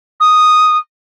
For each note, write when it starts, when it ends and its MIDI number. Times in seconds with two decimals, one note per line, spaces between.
0.20 0.77 87